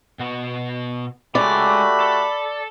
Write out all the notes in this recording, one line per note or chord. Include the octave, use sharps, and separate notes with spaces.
B2 F#4
G#3 A3 C#4 F#4 G4 D5 B5
A4